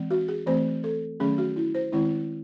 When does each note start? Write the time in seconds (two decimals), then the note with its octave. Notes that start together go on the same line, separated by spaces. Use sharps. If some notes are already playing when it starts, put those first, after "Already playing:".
Already playing: E3 G#3 C4
0.11 F#4
0.28 G#4
0.47 E3 A3 C4 C5
0.84 A4
1.20 D#3 F#3 A3 C#4 G#4
1.38 F#4
1.56 E4
1.75 C5
1.92 D#3 G#3 C4 E4